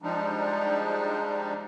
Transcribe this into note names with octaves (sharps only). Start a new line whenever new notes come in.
F3 G3 G#3 D4 D#4